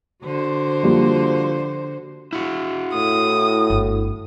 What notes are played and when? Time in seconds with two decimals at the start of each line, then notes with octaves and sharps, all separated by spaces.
0.24 D3 F#4 C5
0.83 F3 G3 A#3
2.33 E4 F#4
2.93 A2 D#6
3.70 G1